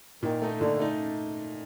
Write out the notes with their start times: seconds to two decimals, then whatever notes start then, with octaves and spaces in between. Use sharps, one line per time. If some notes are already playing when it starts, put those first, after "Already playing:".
0.23 A#2 D#3
0.42 A3 D#4
0.60 A#2 D3
0.79 A3 D#4